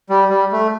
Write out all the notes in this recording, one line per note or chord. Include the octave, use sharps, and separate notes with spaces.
G3
G3
A3